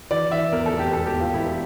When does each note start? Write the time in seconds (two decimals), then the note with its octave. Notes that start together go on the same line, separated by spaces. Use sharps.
0.11 E3 D5
0.31 E3 E5
0.52 E2 A#4
0.66 A4
0.73 F1
0.79 G4
0.93 E1 A4
1.06 G4
1.13 E2
1.20 F4
1.34 E1 E4